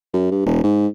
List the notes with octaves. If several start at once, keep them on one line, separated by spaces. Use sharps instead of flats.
F#2
G2
E1
G#2